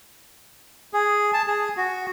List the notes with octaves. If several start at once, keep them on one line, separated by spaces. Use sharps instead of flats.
G#4
A5
G#4
F#4